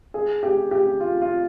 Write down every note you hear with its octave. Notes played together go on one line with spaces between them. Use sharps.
G#4
G4
G4
F4
F4